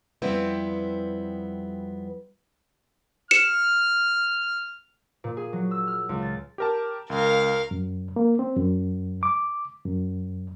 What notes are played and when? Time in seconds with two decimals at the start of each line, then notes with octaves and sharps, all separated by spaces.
0.22 F2 G3 B3 C4 E4 B4
3.31 F6 C#7 E7
5.24 A#2
5.37 G#4
5.53 F#3
5.71 E6
5.87 F6
6.09 C#2
6.22 A6
6.58 G4 A#4 A5
7.10 C#2 A#4 F5
7.71 F#2
8.16 A#3
8.39 C4
8.57 F#2
9.23 D6
9.85 F#2